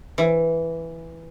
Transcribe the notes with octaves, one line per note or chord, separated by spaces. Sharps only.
E3